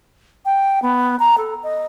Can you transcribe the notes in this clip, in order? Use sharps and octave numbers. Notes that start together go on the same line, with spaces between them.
G5
B3
A#5
A4
D#5